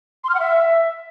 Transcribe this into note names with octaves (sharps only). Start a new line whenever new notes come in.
C6
F6
F#5
E5